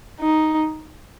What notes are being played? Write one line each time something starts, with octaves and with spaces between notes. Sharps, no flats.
D#4